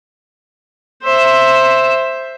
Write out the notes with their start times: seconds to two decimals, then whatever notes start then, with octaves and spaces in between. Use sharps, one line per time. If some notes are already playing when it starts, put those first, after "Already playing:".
1.03 C5 E5